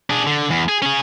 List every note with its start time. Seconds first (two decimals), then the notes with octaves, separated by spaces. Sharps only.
0.10 D4 G#4
0.27 D3
0.50 E2
0.69 G#4
0.82 C#4 G#4